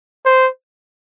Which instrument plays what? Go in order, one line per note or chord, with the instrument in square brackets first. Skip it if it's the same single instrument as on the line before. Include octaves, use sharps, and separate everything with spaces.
[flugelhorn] C5